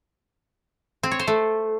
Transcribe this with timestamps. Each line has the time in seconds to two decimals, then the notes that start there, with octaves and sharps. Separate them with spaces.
1.03 C4
1.11 C#5
1.19 C5
1.28 A3